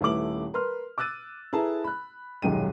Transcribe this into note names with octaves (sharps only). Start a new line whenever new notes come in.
D#1 A3 E4 B4 D6 F#7
A#4 B4 C6 F6
D6 E6 F#6 A6 D#7
E4 G#4 A4 B4 A5 A#5
B5 F#6
D#1 B1 F#2 G#3 G5 D#7